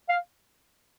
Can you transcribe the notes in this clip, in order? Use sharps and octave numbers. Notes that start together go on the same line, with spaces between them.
F5